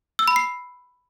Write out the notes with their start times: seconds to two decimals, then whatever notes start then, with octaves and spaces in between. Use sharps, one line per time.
0.19 E6
0.28 B5
0.36 C7